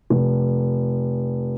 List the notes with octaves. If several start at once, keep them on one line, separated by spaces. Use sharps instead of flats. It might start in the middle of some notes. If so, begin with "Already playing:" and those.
F1